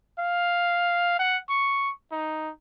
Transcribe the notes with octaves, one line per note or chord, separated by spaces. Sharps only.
F5
F#5
C#6
D#4